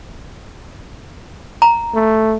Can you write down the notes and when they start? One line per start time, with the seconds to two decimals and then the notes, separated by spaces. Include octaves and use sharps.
1.62 A#5
1.95 A3